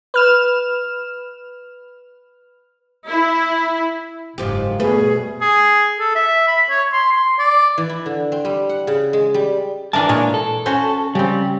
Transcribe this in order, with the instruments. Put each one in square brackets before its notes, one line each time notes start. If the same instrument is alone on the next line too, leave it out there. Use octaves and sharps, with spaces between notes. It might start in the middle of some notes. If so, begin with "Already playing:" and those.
[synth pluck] B4 F6 E7
[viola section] E4
[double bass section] F#1 [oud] G#2 F3 G4
[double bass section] B2 [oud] G3 B4 [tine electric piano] A3 [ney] G#4
[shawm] G#4
A4
E5
B5
C#5
C6
C6
D5
[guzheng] E3
E4
D3
C4
G3
F#5
C#3
G#3
G3
[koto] E3 D4 A#4 [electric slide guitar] D5 E5 A5
[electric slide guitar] A#2 D4 [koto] G#3 A#4 C#5
[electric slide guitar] A4
[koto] C#4 F#4 C5
[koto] C#3 C4 [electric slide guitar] G3